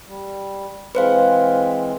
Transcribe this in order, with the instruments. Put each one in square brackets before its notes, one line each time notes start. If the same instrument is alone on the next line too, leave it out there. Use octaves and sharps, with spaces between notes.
[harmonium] G3
[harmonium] E3 G#3 C4 [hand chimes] B4 C5 F5